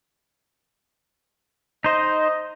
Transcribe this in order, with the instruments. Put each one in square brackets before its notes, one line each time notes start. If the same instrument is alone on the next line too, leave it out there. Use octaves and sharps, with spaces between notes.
[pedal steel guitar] D#4 C5 [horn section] D#5